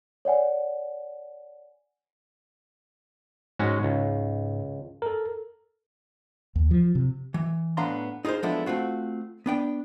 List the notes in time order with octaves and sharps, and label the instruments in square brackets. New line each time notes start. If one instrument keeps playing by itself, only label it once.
[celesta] C#5 D5 F#5 G#5
[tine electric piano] G#2 [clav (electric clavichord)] G#3 C#4 F#4
[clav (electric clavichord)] C#2
[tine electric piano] A4 A#4
[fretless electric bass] D#2
F3
C3
[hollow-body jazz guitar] E3
A2 B3 D4 F5 A#5 C6
D#4 F4 G#4 A#4 C5
F3 G#3 B3 D4 E4 A4
A3 C4 F4 F#4
B3 D4 G5